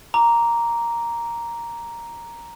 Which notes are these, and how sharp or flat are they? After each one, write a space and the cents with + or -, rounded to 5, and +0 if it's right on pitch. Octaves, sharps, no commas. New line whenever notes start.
A#5 +0 D6 -15